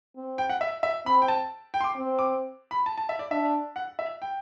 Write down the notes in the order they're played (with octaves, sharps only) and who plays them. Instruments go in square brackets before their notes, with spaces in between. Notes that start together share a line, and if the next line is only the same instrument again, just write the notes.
[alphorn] C4
[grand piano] G5
F#5
E5
E5
[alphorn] C4 [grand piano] B5
[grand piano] G5
A5
G5
C6
D6
[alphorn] C4
[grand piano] D6
B5
A5
A5
E5
D5
[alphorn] D4 [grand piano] E5
[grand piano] F#5
E5
G5